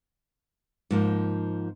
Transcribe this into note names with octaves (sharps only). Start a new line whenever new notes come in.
G#2 F3 A#3